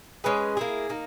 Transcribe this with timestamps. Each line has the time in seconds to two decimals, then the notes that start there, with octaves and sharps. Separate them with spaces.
0.24 G#3 C#4 G#4 B4
0.57 A#3 E4 G#4
0.89 A#3 D#4